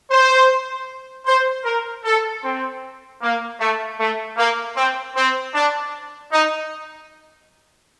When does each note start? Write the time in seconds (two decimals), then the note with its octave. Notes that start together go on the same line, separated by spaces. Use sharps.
0.11 C5
1.26 C5
1.65 A#4
2.05 A4
2.43 C4
3.21 A#3
3.59 A3
3.99 A3
4.37 A#3
4.76 C4
5.16 C4
5.54 D4
6.32 D#4